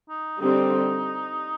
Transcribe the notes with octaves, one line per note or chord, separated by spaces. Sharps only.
D#4
D3 G3 C4 D#4